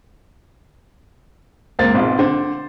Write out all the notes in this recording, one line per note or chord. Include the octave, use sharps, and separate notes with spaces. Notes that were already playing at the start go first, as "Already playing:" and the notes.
C#2 A#3 C4 A6
A#1 G#2 B2 C4 F4
D3 C5